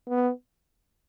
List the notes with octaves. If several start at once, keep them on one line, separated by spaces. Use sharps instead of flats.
B3